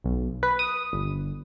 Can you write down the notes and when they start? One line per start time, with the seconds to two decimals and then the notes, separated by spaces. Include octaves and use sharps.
0.04 B1
0.43 B4
0.59 D#6
0.93 G1